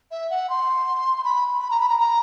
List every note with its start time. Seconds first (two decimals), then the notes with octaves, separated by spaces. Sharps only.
0.11 E5
0.30 F#5
0.50 C6
1.18 C6
1.24 B5
1.61 B5
1.70 A#5
1.80 B5
1.89 A#5
1.99 A#5